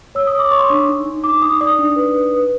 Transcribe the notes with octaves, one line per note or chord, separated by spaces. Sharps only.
C#5 E6
D#6
C#5 D6
C#5 C#6
C6
D4 C#6
D#4
D#4
D#4 D6
D#4 D#6
D5 D#6
D4
B4
B4
B4